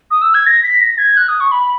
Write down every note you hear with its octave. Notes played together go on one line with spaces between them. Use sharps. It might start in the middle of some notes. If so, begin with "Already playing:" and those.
D#6
E6
G#6
A#6
B6
A#6
G#6
F#6
D#6
C#6
B5